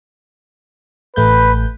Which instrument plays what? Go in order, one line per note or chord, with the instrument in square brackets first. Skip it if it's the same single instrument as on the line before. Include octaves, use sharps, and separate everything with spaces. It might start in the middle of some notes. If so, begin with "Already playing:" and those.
[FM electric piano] A1 A3 G6 [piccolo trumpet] B4